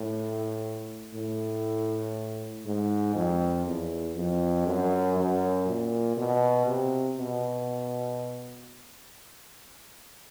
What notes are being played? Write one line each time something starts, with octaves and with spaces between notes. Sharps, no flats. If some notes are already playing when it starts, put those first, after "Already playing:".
Already playing: A2
A2
G#2
F2
E2
F2
F#2
F#2
A#2
B2
C3
B2